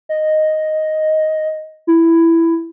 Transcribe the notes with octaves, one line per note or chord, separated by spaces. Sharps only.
D#5
E4